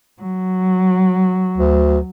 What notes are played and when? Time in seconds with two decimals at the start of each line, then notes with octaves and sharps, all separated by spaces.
0.22 F#3
1.58 D2